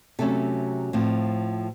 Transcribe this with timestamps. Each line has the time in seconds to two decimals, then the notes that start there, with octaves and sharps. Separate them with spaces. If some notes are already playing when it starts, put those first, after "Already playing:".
0.19 C3 F#3 A3 C#4 A4
0.93 A2 F3 C4